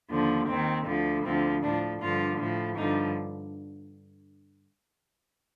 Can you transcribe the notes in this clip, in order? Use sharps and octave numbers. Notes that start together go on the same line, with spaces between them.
D#2 D3 F3
D#2 D#3 C4
D2 D3 F3
D2 D3 F3 C4
A2 F3 D4
G2 D3 F3 F4
A2 F3
G2 D3 F3 D#4